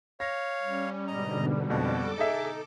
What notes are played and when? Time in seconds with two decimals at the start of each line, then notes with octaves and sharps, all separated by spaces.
0.20 C#5 F5 A#6
0.62 G3 C#4
1.07 G#2 B2 D3 D#5 A#5
1.70 F2 B2 F#4 A4 D6
2.18 D#4 G#4 D#5 E5